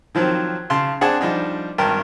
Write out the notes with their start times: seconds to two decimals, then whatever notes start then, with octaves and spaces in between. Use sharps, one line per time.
0.15 D#3 F3 F#3 C4
0.70 C#3 A5 C6
1.01 C4 D4 G#4 F#5 G#5 A5
1.21 F3 G3 D4 D#4
1.78 G#1 G2 A#4 G5 A5